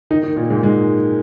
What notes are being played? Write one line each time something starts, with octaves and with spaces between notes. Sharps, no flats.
D#3 D#4
D#3 D#4
A#2 A#3
G#2 G#3
G#2 G#3